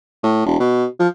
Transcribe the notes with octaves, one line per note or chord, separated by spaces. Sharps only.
A2
E1
B2
F3